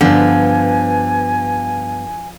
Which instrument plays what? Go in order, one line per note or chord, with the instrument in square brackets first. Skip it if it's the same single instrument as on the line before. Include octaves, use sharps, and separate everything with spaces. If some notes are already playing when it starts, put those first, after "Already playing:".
[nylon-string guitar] G2 B3 [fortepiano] D3 [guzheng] F3 [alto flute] G#5